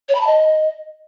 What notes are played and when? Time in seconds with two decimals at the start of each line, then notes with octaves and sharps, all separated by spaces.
0.09 C#5
0.15 B5
0.21 A5
0.27 D#5